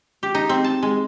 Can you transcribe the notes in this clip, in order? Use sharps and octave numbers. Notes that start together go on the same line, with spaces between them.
G4
D#4
C4
A5
G#3